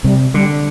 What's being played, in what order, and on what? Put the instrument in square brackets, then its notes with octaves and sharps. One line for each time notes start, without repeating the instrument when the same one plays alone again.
[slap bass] C3 [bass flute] G3
[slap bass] D3 [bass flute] G3